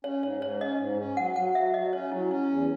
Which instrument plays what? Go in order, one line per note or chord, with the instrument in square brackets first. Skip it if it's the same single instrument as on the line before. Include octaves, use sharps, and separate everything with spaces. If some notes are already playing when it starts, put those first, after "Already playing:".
[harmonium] C#4 [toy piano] C#5
[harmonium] G#2 [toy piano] C#5
[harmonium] G#2 [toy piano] C#5
[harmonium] C#4 [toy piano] D#5
[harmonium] G#2
C#4
[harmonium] F#3 [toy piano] F#5
[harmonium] F#3 [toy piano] F#5
[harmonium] F#3 [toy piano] E5
[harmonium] F#3 [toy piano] D#5
[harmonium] C#4 [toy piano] C#5
[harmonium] F#3 [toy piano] E4
[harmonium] C#4 [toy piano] E4
[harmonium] E2